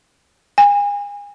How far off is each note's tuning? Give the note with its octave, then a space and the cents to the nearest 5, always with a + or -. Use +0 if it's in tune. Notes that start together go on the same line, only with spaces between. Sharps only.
G#5 -35